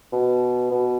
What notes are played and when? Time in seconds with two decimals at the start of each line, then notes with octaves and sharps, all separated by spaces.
0.12 B2
0.71 B2